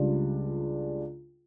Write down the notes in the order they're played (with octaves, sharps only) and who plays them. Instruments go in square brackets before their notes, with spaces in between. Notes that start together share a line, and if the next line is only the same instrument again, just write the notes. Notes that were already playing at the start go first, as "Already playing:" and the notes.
Already playing: [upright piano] C#2 C#3 G3 D4 F4